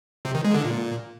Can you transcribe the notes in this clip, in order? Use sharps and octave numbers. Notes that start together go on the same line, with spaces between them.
C3
D#3
G#3
D3
A#2